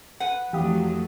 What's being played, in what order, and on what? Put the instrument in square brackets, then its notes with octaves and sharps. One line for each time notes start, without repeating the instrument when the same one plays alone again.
[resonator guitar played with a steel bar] B4 F#5
[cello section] F2 F#3 A3 [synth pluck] E3 D#6 [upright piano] G4 F5